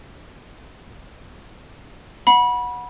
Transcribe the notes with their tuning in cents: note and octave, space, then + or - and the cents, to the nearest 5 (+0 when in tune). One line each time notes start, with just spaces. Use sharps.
F#5 -15 B5 -25